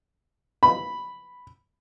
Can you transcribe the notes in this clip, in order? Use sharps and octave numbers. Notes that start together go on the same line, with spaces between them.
B5